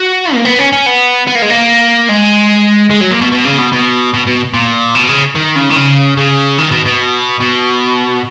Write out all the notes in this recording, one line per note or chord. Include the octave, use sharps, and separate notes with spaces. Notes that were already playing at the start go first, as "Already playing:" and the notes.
Already playing: F#4
A#3
B3
C#4
C#4
B3
B3
A#3
G#3
A#3
G#3
G#3
F#3
A#2
B2
B2
C#3
B2
B2
B2
B2
A#2
B2
C#3
D#3
C#3
D#3
C#3
C#3
D#3
B2
B2
B2